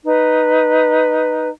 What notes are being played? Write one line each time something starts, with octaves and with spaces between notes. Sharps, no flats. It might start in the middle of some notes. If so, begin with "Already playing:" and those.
D#4 B4